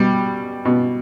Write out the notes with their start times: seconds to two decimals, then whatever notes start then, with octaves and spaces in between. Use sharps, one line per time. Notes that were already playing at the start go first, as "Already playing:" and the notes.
Already playing: B2 G3
0.65 B2